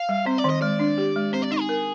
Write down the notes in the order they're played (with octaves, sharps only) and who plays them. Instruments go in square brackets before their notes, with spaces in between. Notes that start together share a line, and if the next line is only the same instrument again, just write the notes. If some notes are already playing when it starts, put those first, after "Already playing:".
Already playing: [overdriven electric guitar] F5
[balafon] G3
[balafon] C4 [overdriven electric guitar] C5
[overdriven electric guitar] D5
[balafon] D#3
[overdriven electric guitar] D#5
[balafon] G#3 [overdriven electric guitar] D5
[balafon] D4
G4
G#3
[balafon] C4 [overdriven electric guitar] C5
[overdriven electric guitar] D5
[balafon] D#4 [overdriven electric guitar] D#5
[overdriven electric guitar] G#4
[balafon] A#4